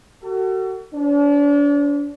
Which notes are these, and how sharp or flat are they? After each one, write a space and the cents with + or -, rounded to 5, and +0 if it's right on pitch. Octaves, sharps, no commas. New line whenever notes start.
F#4 +30 A4 +35
D4 -35 C5 +5